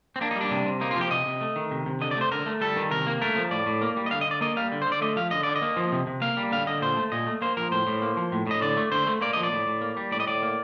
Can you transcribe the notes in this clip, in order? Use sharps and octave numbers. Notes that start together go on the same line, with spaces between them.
C4
A#3 D4
D#4
G3
D4
C3
C3
A#3 D#4
F4
F3 G4
C3 D#5
C3
A3
D#3
C3
C3
D3 D#5
D5
A3 C5
D3 A#4
A3
G3 A4
D#3
C3 A#4
A#3
A3 A#4
F3
A2 D5
A2
A#3
G3
D#5
D3 F5
D#5
D3 D5
A#3 D#5
G3 F5
D3
C5
D3
D5
A3 D#5
F3 F5
D3 D#5
D3 D5
D#5
A#3
F3
C3
C3
A#3 F5
G3
D3 F5
D3 D#5
A#2 C5
A3
A#2 D#5
A3
A#3 C5
F3 A#4
A2 C5
A2
A#3
F3
A2
A2 D#5
D3 D5
A3
D3 C5
A3
A#3 D5
F3 D#5
D5
A2
A2
A#3
G3
A2 D5
D#5
A2 D5
A#3